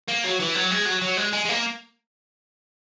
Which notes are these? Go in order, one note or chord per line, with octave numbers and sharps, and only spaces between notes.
A#3
F#3
E3
F#3
G#3
F#3
F#3
G#3
G#3
G#3
A#3